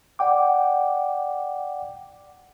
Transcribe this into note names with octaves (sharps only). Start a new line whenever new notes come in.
D5 F#5 G5 D6